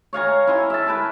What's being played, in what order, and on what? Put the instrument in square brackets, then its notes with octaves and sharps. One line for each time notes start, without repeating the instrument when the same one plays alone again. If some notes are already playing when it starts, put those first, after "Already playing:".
[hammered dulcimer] C#5 F5 G#5 A#5
E4 G#5 C6
E5 A5
A#4 B4